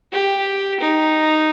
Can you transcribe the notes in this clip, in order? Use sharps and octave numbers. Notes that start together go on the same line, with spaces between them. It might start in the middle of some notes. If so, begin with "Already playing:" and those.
G4
D#4